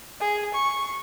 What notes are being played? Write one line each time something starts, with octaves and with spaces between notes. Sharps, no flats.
G#4
C#6